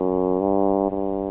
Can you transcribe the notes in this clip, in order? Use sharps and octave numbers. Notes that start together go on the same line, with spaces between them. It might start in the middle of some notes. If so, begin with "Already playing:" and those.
Already playing: F#2
G2
G2